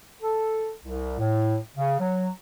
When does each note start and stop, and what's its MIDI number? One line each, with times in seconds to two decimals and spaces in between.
0.22 0.70 69
0.85 1.17 36
1.19 1.57 45
1.76 1.96 49
2.00 2.30 54